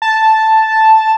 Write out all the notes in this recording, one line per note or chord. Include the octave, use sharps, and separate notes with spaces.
A5